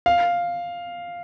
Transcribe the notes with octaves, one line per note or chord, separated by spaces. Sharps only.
F5